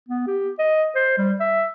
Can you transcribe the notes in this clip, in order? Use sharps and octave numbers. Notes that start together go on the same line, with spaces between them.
B3
G4
D#5
C5
G3
E5